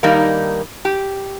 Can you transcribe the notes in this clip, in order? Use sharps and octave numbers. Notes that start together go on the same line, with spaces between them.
G2 D#3 G3 A#3 D#4
G4